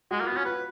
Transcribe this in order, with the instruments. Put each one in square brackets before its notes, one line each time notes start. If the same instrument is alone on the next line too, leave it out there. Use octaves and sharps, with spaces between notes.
[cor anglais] G#3 [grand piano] F#4
[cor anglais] A#3 [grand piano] F4
[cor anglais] B3
[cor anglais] C#4 [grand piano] F#4
[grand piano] F#4 [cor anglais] B4